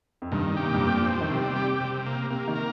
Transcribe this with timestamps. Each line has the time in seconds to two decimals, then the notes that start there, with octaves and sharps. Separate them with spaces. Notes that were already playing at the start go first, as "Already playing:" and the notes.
0.22 F2
0.32 G2 D#3
0.56 C3 G4
0.65 A#2
0.74 G2
0.81 F2 A#2
1.06 C4
1.21 D#3
1.31 C3 G3
1.56 G4
1.81 C3
2.06 A#3
2.30 C3 A#3
2.48 D#3
2.55 A#4